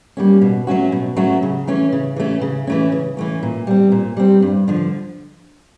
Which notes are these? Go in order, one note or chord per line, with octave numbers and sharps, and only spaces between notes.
G3 A#3 C#4
B2
F#3 A3 C#4 F#4
B2
F#3 A3 C#4 F#4
C#3
E3 A3 C#4
C#3
E3 A3 C#4
C#3
E3 A3 C#4
C#3
E3 A3 C#4
A#2
G3 C4
A#2
G3 C4
G2
D3 F3